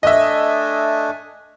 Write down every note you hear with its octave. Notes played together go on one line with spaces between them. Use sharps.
A3 D4 D#5 E5 G#5